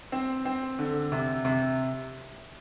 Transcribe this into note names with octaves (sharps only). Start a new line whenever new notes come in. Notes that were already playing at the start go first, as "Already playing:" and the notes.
C4
C4
D3
C3
C3